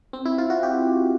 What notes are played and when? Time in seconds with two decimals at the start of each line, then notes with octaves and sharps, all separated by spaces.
0.13 C4
0.25 E4
0.38 F4
0.50 F#4
0.63 G4